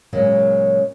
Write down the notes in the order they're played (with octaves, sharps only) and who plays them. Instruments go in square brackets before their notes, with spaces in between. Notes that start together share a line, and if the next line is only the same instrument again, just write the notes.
[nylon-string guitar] A#2 C#3 F#3 G#3 A#3